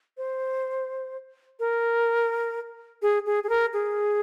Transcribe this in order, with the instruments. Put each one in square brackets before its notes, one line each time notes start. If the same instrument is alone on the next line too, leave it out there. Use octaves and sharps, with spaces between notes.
[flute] C5
A#4
G#4
G#4
G#4
A#4
G#4